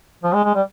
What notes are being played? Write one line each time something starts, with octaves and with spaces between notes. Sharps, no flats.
F3
G#3
G#3
G3